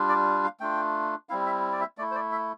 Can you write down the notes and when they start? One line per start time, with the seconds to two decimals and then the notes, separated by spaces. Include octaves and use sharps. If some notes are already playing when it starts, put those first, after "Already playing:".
Already playing: G3 D4 F4
0.09 D5
0.44 F5
0.60 A3 D4 F4 G5
1.29 G3 C4 E4 F5
1.46 E5
1.72 D5
1.81 E5
1.98 A3 D5
2.01 E4
2.11 C5
2.15 D5
2.32 E5